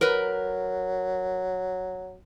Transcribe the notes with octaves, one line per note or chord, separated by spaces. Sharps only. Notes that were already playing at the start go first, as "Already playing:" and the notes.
F#3 A#4 B4